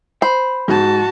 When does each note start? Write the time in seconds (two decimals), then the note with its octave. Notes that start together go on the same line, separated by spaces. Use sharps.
0.22 C5 B5
0.68 G#2 F#4 A5